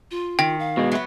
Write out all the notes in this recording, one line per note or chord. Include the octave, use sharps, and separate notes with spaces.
F4
D#3 G5
F5
B2 G#3
F#3 B3 E5